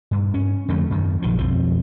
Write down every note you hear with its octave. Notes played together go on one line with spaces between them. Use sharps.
G2
C#4
F2 D3 A3
F#2 D#3
A#1 D#3 F3
B1 F2 F3